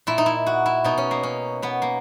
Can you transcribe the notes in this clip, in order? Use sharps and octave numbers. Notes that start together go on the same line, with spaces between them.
A#2 E4
D#4
E4
F#4
E4
B2 D#4
C#4
A#3
C#4
B2 B3
A#3